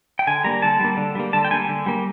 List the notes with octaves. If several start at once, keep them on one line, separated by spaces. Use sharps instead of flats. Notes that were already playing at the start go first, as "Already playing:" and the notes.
G5
D3 G#5
G3 A#3 A#5
D3 A5
G3 A#3
D3
G3 A#3
D3 A5
G5
G3 A#3 G#5
D3
G3 A#3